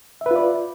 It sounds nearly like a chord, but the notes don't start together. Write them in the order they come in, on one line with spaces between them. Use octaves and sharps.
E5 B4 F4 D5